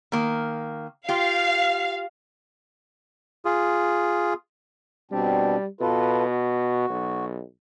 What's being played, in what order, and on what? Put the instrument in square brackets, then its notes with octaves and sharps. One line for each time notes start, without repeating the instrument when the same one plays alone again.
[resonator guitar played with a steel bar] D#3 A#3
[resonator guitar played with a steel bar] F4 G4 [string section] F5
[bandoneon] F4 G#4
[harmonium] B2 C4 D4 [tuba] G3
[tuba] B2 [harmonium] F4 A4 B4
[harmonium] F#4
[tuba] B1